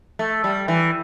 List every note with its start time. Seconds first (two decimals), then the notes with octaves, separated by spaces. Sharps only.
0.19 A3
0.44 G3
0.68 E3